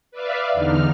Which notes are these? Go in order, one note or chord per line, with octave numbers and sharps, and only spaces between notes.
B4 D5 E5 F5
E2 D3 D#4 F6